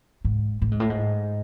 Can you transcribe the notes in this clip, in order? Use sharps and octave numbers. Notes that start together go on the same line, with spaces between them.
G#2
A2
G#2
A2
G#2